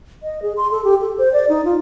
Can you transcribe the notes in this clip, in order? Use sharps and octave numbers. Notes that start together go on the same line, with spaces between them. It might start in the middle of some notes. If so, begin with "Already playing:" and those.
D#5
G#4
C6
A4
G4
A4
C5
D5
D#4
F4